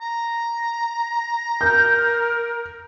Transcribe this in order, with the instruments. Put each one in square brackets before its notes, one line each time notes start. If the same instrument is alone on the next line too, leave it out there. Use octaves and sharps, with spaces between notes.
[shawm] A#5
[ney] A#4 [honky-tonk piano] G6